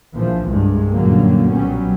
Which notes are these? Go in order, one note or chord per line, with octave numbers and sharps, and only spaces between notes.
A#1 E3 F3
C2 G2 C3 G#3
F#2 A#2 D3 F#3 G3 A#3
B1 F#3 G3 B3 C#4